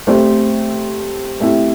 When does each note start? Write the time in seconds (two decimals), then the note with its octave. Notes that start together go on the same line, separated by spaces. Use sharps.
0.07 A3 C4 G4 C5
1.40 A3 C4 E4 G4